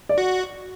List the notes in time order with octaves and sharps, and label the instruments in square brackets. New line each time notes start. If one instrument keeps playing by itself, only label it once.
[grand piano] D5
[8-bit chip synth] F#4